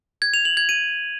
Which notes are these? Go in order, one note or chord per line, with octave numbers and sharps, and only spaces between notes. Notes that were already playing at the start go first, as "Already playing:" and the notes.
G#6
F7
F#7
G#6
D#7